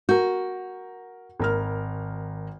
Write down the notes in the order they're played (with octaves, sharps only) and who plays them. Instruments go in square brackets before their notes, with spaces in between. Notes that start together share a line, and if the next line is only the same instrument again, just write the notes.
[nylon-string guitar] F#4 [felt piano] A#4 G6
[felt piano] G#1 A#4 F6